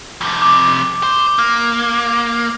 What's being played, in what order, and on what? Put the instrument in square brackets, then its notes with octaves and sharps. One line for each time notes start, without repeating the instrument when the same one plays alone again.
[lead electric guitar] F2 C3
[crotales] D6
[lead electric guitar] C5
A#3